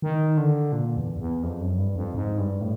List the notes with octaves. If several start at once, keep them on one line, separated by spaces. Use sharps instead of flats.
D#3
D3
A#2
E2
E2
F2
F#2
G2
F2
G#2
G2
A2